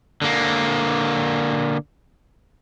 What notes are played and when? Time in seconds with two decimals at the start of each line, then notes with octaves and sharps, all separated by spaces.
0.22 D3 A#3